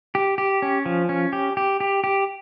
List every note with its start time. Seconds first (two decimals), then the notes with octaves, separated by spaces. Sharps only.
0.15 G4
0.38 G4
0.62 C#4
0.86 F3
1.09 C#4
1.33 G4
1.57 G4
1.80 G4
2.04 G4